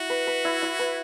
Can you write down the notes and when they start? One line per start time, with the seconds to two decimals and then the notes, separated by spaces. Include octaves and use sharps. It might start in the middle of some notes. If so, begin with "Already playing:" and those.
Already playing: E4 F#4 E5
0.10 B4
0.27 B4
0.45 E4
0.62 E4
0.79 B4